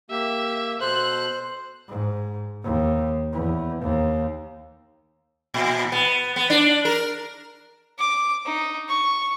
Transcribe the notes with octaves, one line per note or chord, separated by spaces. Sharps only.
A#3 G4 E5
B2 A4 C5 F#6
G#2
D#2
E2
D#2
A#2
B3
B3
D4
A#4
D6
D#4
C#6